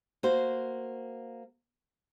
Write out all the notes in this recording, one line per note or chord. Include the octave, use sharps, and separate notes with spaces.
A#3 F#4 C5